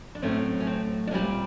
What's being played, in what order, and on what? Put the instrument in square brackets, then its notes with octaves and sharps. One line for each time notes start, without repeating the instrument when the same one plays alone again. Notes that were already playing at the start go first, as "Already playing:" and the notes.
[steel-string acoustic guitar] D4
A2 F#3 A3 C4 C#4
C#4
C4
D4
A#2 G3 C4 C#4